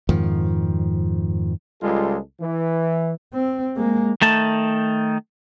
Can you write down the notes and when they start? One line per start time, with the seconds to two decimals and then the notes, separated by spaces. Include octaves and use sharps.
0.09 F2 G#2 D#3 F3
1.81 C#2 G3 G#3 F4 A4
2.41 E3
3.34 C4
3.76 G#3 A#3
4.22 D#3 A3 A5